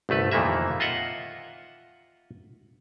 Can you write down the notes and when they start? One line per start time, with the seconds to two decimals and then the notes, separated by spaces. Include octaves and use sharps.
0.09 G1 C2 A3 B4
0.31 F2 A#2 D#3 E3 A#3 E5
0.80 F4 D#5 E5 F#5